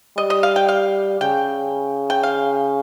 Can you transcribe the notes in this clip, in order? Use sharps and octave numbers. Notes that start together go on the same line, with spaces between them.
G3 D#5
D#5
F5
G5
F5
C#3 G5
G5
F5